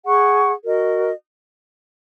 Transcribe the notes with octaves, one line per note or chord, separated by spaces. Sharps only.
G#4 F#5 C#6
F#4 A#4 D#5